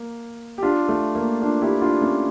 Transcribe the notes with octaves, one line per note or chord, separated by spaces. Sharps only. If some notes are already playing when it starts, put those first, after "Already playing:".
Already playing: A#3
G4
D4 F4
A3
A#3
D4 F4
E4 G4
D4 F4
A3 C#4